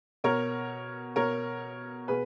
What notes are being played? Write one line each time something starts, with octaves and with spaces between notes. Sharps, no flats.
B2 A#4 C#5
B2 A#4 C#5
B2 G#4 B4